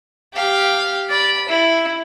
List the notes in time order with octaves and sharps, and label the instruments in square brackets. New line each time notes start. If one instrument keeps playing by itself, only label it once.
[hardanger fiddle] G4 F5
D5 B5
E4